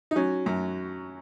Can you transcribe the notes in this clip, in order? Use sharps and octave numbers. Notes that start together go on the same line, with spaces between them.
D#4
F#3 C#4
F#2